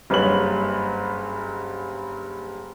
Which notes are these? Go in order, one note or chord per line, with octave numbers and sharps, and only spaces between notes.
F#1 G2 B4 C#5 F#7